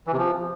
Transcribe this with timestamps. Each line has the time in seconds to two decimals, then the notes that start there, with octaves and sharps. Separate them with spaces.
0.07 E3
0.13 C3
0.18 F3